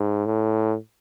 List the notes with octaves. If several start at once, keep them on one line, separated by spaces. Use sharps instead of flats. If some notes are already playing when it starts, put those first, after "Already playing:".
Already playing: G#2
A2